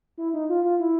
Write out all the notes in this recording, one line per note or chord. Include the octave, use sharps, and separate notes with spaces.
E4
D#4
F4
F4
E4